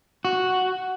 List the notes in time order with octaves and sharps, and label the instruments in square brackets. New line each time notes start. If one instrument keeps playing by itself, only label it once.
[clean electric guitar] F#4